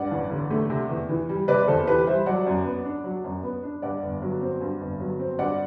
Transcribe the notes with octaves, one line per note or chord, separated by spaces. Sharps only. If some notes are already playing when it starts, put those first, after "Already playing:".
Already playing: G2 D5 F#5
A1
D3
A3
C3
E2
E3
G3
C3 B4 D5
E2 A4 C5
E3 G4 B4
G3 C5 E5
F#3 D5 F#5
F#2
B3
D4
F#3
F#2
B3
D4
G2 D5 F#5
G1
F#3
C4
G2
G1
F#3
C4
G2 D5 F#5